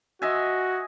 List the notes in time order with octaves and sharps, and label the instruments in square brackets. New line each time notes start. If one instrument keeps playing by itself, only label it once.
[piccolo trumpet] F#4 [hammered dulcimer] D#5 E5 G#5